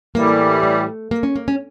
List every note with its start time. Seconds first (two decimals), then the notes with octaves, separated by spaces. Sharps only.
0.15 A2 E3 G3 A#3
0.63 A3
1.11 A#3
1.23 C#4
1.36 A#3
1.48 C#4